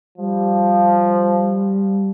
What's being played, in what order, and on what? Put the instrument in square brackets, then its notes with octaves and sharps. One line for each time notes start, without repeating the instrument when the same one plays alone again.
[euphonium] F3 [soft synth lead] G3